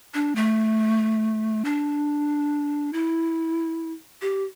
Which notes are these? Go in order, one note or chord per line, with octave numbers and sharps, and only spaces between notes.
D4
A3
D4
E4
G4